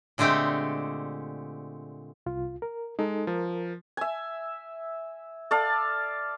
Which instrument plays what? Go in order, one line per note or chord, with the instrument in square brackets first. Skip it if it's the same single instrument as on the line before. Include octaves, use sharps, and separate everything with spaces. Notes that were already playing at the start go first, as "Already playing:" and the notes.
[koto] A#2 D3 G#3 A3 C4 G4
[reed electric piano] C2 F4
A#4
[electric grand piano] G#3 [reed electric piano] D#4 A4
[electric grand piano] F3 [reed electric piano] A#4
[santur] E5 G#5
A4 D5 F5